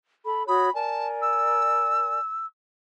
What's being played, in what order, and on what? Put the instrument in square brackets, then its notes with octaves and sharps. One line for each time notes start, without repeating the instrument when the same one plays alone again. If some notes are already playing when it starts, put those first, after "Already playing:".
[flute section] A4 B5
[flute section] F#4 C#5 D#6 [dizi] B5
[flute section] A#4 D5 G#5 [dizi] A5
[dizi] E6